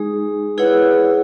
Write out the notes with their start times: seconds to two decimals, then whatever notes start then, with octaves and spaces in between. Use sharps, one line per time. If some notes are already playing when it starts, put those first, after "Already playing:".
Already playing: G#3 D#4 G#4
0.58 E4 G#4 B4 C#5 F#5